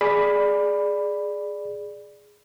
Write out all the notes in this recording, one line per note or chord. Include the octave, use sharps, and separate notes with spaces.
G#4 D5 B5